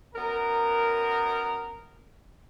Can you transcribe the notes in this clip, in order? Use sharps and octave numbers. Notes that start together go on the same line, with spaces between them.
F#2 B3 A#4